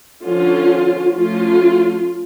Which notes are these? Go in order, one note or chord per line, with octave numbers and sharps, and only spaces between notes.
D3 F3 C#4 F4
F3 A3 C#4 F4